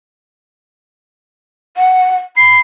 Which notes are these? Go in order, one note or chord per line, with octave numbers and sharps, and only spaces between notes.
F#5
B5 C7